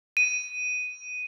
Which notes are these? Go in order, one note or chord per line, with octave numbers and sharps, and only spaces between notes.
D#7